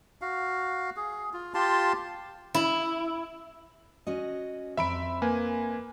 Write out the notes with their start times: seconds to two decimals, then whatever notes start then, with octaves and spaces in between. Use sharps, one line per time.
0.22 F#4 F5
0.96 G#4
1.33 F4
1.54 F4 G4 A5 C6
2.54 E4
4.07 C#4 F#4 D#5
4.77 F2 C5 E5 A#5 B5 D7
5.22 A#3 B4 G#5